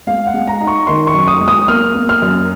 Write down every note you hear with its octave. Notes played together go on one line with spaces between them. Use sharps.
G#3 F5
F#5
G#3
A#5
D#4
C#6
D#3 C6
C#6
F#2
D#6
G#3
D#6
A#3 F6
A#3
F6
F#2